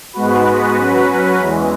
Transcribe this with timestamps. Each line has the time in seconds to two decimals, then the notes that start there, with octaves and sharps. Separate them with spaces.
0.13 G#2 G#3 B3 F#4 B4
0.77 F#3 C#4 F#4 B4
1.39 E2 E3 G#3